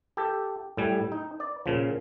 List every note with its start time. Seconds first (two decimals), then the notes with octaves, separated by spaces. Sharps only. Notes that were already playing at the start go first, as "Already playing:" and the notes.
0.17 G4 A4
0.77 A2 G3 G#5
1.12 D#4
1.40 D5
1.66 A#2 C#3 F3